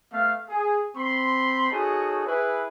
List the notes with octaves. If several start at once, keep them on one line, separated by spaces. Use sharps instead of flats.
A3 B3 F5
G#4
C4 B5 C6
D#4 F#4 G#4 A4 C#5
E4 G#4 B4